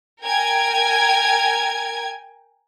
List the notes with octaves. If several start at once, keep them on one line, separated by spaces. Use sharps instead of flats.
A#4 G5 G#5 G#6